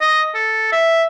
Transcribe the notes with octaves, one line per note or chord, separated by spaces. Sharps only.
D#5
A4
E5